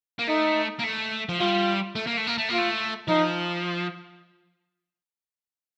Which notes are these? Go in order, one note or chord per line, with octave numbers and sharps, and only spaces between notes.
A#3
A3 D#4
A#3
A3
F3
G3 F4
A3
A#3
A3
A#3
A3
A#3 F4
A3
F3 D#4